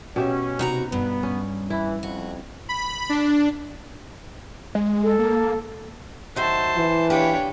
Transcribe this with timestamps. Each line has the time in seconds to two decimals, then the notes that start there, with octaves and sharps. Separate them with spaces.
0.16 B2 C#4 G4 E5
0.59 C3 D#4 F#4 B4 A#5
0.92 G2 B3
1.23 C#4
1.70 E3 E4
2.03 F2 F#4
2.69 B5
3.09 D4
4.75 G#3
5.03 A4
5.19 A#3
6.36 D#3 F#3 C5 E5 A5
6.76 E3
7.10 A#3 D4 G4 B4 C#5